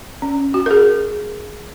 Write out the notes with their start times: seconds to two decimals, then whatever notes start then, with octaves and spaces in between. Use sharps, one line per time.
0.22 C#4
0.54 F#4
0.66 A#4
0.71 G#4